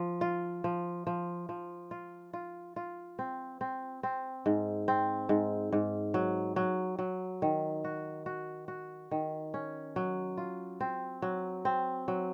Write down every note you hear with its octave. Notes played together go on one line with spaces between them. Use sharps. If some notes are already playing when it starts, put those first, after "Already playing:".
Already playing: F3
F4
F3
F3
F3
F4
F4
F4
C4
C4
C4
G#2
C4
G#2
G#2
F#3
F#3
F#3
D#3
F#4
F#4
F#4
D#3
C#4
F#3
F4
C4
F#3
C4
F#3